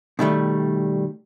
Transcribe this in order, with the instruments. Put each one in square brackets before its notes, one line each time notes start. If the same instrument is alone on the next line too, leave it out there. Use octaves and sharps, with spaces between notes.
[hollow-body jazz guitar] B2 D#3 G3 A3